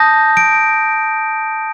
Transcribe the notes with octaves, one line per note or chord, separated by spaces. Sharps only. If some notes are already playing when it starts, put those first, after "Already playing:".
Already playing: A5 D#6 G6 A#6
D7